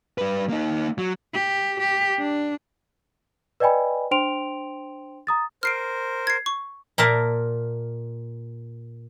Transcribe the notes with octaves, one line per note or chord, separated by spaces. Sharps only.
G3 B4
A#3 D#4
F#3
G4
G4
D4
B4 D5 D#5 G5 G#5 B5
D4 C5 G5 C6 D7 F7
A#5 D#6 A6
A#4 C5 F6 C7 D7
G#6 C7
C#6
A#2 A#4 E5 A5